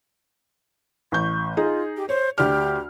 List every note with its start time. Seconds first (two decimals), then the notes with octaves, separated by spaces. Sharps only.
1.12 A1 C#6 G6
1.57 D#4 F4 G#4
1.97 G4
2.09 C5 C#5
2.38 D2 G4 D5 F6